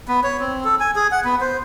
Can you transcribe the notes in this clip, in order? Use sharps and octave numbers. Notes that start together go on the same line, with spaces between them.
B3
C#5
C4
A4
G#5
G#4
F#5
B3
C5